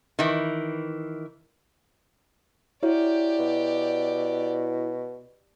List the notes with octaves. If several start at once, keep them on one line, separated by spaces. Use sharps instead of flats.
D#3 E3
E4 F#4 G4 C#5 D5
B2